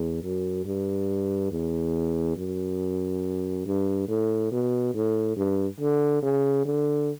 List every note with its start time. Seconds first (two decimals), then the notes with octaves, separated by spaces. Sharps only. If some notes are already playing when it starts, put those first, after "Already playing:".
Already playing: E2
0.23 F#2
0.66 G2
1.51 E2
2.37 F#2
3.66 G2
4.08 A2
4.52 B2
4.95 A2
5.37 G2
5.80 D3
6.23 C#3
6.65 D3